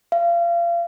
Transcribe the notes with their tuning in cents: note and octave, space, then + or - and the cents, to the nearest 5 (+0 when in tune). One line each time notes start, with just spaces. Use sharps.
F5 -30